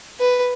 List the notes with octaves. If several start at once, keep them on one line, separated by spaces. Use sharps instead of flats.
B4